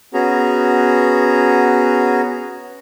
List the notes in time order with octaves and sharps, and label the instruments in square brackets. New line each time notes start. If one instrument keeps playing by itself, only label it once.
[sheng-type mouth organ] B3 C#4 F#4 G#4 A#5